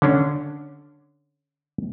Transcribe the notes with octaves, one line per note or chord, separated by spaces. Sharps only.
D3 C#4 D4